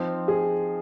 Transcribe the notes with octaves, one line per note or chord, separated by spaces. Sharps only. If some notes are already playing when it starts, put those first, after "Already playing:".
Already playing: F3 C4 D#4 C5
G#4